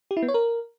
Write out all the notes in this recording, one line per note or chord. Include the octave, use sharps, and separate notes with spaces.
G4
E4
B3
C#5
A#4